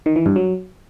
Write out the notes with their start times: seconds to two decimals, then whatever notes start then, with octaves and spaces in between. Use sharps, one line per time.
0.06 D#3
0.16 E3
0.26 G2
0.36 F#3